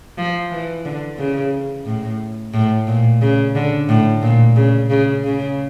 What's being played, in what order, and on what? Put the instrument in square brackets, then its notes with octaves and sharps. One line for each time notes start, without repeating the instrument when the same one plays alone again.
[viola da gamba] F3
E3
D3
C#3
A2
A2
A#2
C#3
D3
A2
A#2
C#3
C#3
C#3